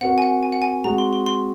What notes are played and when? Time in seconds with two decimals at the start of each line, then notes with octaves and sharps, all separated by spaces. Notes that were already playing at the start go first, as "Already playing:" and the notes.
0.01 C4 F#4 A#4 F#5
0.18 G#5
0.22 F#5
0.43 G#5
0.52 F#5
0.62 G#5
0.84 G#3 C4 F#4 A#5
0.98 C6
1.13 C6
1.26 C6